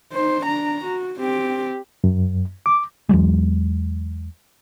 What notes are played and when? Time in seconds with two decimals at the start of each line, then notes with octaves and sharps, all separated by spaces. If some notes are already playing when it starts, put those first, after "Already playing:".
0.13 D#4 C5
0.43 D4 A#5
0.84 F#4
1.20 C4 G4
2.04 F#2
2.66 D6
3.09 E2 E3 F#3 G#3